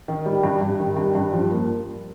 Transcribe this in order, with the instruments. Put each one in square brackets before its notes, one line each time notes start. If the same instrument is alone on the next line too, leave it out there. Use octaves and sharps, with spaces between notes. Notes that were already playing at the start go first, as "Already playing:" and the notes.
[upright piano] D#3
G3
G2
G2
D#3
G2
G2
F3
A#3